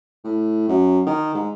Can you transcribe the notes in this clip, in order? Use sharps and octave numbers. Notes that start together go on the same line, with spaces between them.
A2
F#2
D#3
G#2